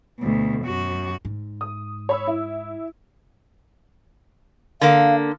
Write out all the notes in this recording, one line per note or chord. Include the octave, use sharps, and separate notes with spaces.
D2 B2
F#2 F#4
G#2
D#6
C#5 B5 E6
E4
D3 A#3 F5